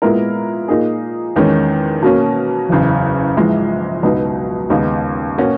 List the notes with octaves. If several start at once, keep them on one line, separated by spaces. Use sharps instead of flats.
A#2 G#3 B3 E4 A#4
A#2 A#3 D#4 G#4
E2 D#3 G#3 C#4
B2 A#3 C#4
F#1 E2 C#3
A#1 G#2 E3 G#3
C#2 B2 F#3 B3 D#4
D#2 C#3 G#3 B3 D#4
B2 A#3 C#4 F#4